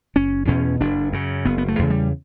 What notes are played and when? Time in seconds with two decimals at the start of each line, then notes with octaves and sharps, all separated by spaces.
0.15 F#1 C#4
0.48 E2 B2 C#4
0.81 F#1 D4
1.13 F#2 C#3
1.45 F#1 B3
1.58 B3
1.68 A3
1.79 E2 C#3
1.90 G3